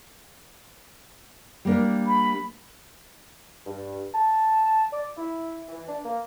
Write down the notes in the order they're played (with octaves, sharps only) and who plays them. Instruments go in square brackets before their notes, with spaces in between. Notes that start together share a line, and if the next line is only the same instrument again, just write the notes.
[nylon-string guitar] G3 A#3 D4
[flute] B5
[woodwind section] G2
A5
D5
E4
E3
D4
A#3